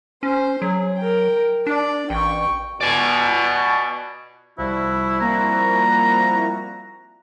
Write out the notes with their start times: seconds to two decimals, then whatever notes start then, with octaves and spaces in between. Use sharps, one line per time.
0.23 C#4 C5
0.62 F#3 G#4
0.97 A#4 G5
1.67 D4 D5
2.10 A1 G5 C#6
2.81 B2 D5 G#5
4.58 C2 F3 G3 E4 F#4
5.21 A#3 C4 E4 A#5